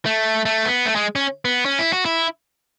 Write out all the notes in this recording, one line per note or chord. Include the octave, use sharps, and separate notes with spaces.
A3
A3
B3
A3
G#3
C#4
B3
C#4
E4
F#4
E4